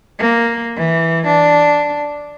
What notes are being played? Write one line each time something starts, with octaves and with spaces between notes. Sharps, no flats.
A#3
E3
D4